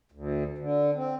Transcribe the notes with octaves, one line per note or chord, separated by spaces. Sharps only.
D2
D3
C4